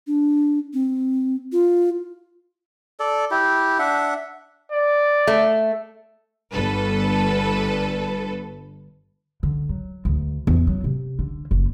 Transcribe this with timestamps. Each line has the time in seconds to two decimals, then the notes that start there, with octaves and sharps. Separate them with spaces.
0.07 D4
0.74 C4
1.52 F4
3.00 A4 D5
3.31 E4 G4
3.79 D4 E5 F#5
4.72 D5
5.27 A3
6.52 G1 A4 B4
9.43 D3
9.69 F#3
10.05 D2
10.47 E2
10.67 F#3
10.84 C3
11.19 D3
11.51 F#1